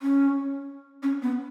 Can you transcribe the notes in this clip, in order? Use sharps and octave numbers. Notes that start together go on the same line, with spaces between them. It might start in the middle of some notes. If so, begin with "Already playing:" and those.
C#4
C#4
B3